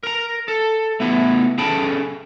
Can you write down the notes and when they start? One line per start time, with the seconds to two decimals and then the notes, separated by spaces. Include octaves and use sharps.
0.03 A#4 A#5
0.48 A4
1.00 A3 B3 E4
1.58 C#4 G#4 A4 G5 A5 B5